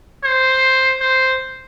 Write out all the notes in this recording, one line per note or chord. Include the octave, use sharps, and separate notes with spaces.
C5
C5